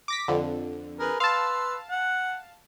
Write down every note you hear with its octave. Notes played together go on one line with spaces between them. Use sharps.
D6 A#6 B6
F2 D3
G#4 A#4 B4
B4 F5 A5 C6 E6
F#5